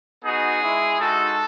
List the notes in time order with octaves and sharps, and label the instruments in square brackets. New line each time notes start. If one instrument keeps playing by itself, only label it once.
[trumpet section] B3 D#4 F#4 G#4
G#3 C#4 E4
G#3 D#4 F#4 A4